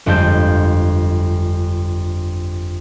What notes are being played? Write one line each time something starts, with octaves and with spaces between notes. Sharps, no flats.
G1 F2 G#3 A5 G6